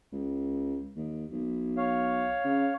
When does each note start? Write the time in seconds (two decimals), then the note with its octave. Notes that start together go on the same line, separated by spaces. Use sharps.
0.12 C#2
0.96 D#2
1.31 B1
1.77 C#5 F5
2.45 C#3